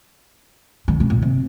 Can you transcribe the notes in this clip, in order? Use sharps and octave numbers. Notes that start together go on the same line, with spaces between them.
D3
C3
A#2
C3